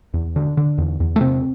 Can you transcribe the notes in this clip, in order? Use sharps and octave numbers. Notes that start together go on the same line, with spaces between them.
E2
D3
D3
E2
E2
A3
C3 C4